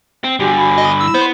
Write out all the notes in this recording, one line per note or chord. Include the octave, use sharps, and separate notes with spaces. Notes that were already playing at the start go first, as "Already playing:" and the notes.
C4
G2 D3 F#4 G4 G#5
B5
D#5
E4 E6
B3 C5